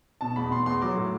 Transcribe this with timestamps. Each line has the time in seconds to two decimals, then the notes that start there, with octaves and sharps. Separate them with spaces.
0.21 B2 A5
0.36 E2 B5
0.51 B2 C6
0.66 E2 C6
0.82 F#3 D6
0.96 A2